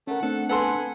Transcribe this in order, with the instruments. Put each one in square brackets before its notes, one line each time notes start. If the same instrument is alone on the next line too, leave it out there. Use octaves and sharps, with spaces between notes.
[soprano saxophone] A3 [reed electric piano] C#4 A#4 [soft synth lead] F#5
[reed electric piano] A3 C4 D4 [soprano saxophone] A4
[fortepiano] B3 A4 C6 [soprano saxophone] F#5 [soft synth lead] G#5